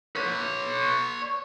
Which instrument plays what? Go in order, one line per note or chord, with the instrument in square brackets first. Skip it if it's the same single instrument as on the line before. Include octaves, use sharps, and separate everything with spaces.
[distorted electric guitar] B4 C#5